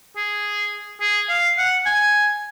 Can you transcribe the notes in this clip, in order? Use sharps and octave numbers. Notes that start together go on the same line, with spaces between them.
G#4
G#4
F5
F#5
G#5